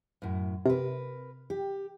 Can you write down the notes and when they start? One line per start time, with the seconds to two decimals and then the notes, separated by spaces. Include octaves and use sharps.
0.22 F#2 A2
0.66 C3 A#4 B4
1.50 G4